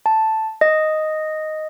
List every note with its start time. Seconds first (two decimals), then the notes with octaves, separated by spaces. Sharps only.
0.06 A5
0.61 D#5